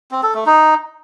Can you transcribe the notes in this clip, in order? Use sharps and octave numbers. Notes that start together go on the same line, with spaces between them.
C4
A4
A3
D#4